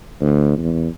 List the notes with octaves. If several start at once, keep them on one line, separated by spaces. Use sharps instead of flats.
D2
E2